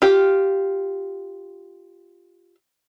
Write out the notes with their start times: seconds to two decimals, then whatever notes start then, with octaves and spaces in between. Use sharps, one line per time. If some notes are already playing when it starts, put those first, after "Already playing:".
0.02 F4 G4